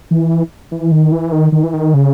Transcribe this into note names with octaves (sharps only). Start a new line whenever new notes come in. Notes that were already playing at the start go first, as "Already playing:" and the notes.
E3
E3
D#3
E3
D#3
D#3
E3
D#3
C#3